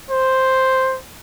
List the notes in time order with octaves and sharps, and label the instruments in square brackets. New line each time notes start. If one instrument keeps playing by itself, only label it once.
[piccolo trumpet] C5